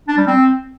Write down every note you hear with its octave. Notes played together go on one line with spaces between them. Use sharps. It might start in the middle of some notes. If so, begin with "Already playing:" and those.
D4
G3
C4